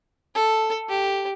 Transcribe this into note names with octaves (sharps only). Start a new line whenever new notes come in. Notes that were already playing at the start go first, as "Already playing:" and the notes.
A4
G4